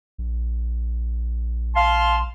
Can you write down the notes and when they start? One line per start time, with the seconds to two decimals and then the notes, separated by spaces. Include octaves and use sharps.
0.18 A#1
1.76 F5 A5 C6